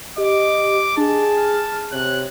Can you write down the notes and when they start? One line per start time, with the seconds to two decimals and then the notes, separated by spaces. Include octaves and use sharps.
0.18 G4 D#5 D6
0.97 D4 G#4 A5
1.37 F6
1.92 C3 C#5 F#6